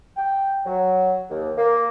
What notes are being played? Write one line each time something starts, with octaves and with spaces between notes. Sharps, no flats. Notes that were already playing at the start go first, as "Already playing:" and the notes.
G5
F#3
D#2
A#3